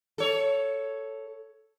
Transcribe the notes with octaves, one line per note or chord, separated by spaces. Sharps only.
A4 C#5